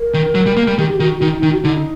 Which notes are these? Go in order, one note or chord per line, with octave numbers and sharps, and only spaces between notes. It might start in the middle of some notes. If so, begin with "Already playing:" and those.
Already playing: A#4
D#3
F#3
G3
A#3
G3
D#3 G4
G4
D#3 F#4
D#3 D#4
D#3 D#4
F#4
D3 D#4